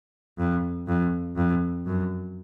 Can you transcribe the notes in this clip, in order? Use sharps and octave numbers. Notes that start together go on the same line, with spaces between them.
F2
F2
F2
F#2